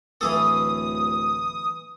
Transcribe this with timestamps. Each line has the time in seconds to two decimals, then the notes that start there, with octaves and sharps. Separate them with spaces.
0.21 D1 E3 G#4 A4 D#6